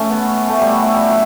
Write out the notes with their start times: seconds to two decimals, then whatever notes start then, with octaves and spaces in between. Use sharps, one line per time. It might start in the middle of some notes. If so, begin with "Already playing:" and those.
Already playing: A3 C#4 E4
0.10 B3
0.49 A3
0.60 G3
0.71 F#4
0.82 E4
0.93 G3
1.10 F#3